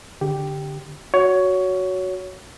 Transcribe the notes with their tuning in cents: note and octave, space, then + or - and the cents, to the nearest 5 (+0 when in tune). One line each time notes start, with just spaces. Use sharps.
D3 +0 G4 +0
F#4 +0 C#5 +15